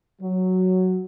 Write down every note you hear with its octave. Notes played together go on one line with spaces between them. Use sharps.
F#3